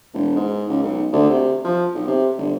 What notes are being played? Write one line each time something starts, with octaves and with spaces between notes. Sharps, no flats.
E1
G#2
C#2
B1
D2
C3
F3
B1
C3
G1